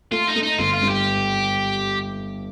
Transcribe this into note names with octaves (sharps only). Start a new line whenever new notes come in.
A3 F4
D#4
A3
D#4
G1 F4
F4
G2
G4